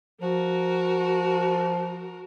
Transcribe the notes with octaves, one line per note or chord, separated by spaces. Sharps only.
F3 F#4 A#4